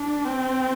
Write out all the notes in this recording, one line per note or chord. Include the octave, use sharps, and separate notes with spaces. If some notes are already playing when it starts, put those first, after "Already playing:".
Already playing: D4
C4